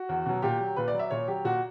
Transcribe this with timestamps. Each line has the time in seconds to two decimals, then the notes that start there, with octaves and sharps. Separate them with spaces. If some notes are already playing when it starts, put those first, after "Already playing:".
Already playing: F#4
0.09 E2
0.26 B2 F#3
0.42 A#2 G4
0.60 F#3
0.76 A#2 B4
0.88 D5
0.94 F#3
0.99 E5
1.10 A#2 C#5
1.28 F#3 G4
1.45 A#2 F#4